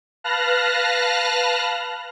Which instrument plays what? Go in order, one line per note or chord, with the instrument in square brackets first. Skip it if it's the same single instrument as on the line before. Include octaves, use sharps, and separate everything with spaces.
[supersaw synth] B4 F5 A5 F6 F#6 A#6